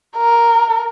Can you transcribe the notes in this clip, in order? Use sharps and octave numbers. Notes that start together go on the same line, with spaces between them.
A#4